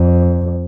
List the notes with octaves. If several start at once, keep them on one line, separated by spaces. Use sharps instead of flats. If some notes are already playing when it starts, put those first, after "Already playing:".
Already playing: F2